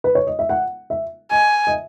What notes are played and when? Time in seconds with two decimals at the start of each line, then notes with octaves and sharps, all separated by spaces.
0.04 B4
0.15 C#5
0.27 D#5
0.39 E5
0.49 F#5
0.90 E5
1.31 D#5 G#5
1.67 D#5
1.71 E5